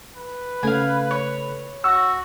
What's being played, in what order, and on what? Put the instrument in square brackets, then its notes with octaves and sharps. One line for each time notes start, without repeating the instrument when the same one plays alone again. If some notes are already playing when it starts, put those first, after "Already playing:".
[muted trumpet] B4
[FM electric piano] C#3 A3 [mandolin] F5 G#5
[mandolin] C#5
[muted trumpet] F#4 [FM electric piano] C#6 A#6 [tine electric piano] E6